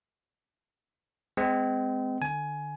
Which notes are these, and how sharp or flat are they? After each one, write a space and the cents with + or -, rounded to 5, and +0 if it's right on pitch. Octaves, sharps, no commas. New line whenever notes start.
G#3 +0 C4 -30
D3 +25 G#5 +15